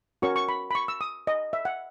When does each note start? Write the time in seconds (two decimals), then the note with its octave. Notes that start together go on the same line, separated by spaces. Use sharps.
0.22 C#4 F#4 A#4 C#5 C#6
0.36 C#6
0.49 B5
0.71 B5
0.75 C#6
0.88 E6
1.01 D#6
1.27 D#5
1.53 E5
1.65 F#5